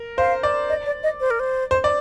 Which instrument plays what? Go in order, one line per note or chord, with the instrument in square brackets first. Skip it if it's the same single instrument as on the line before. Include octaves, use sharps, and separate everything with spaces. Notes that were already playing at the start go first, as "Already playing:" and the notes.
Already playing: [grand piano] A#4
[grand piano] C5 [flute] F5
[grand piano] D5
[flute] D#5
D5
D#5
C5
A#4
C5
[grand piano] C5
D5